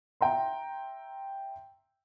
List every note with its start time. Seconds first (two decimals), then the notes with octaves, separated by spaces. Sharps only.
0.21 E5 G5 A#5 C6